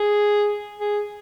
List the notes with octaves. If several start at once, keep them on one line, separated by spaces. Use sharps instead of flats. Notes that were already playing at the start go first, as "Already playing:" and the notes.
Already playing: G#4
G#4